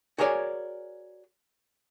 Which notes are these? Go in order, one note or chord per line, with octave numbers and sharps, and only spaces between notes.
F#4 G#4 A#4 C#5 D5 G#5